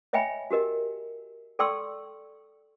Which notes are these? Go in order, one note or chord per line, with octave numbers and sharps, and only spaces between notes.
C#5 D#5 E5 G5 G#5 B5
F#4 G4 A#4 D#5
A4 D5 G5 C6 C#6 E6